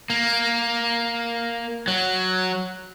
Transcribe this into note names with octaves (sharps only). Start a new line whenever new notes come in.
A#3
F#3